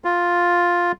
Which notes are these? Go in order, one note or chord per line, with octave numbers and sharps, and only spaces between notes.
F4